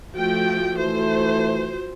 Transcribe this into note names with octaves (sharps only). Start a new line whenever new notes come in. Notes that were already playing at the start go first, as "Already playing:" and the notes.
F3 A3 F4 F#4 G5
E3 A3 C5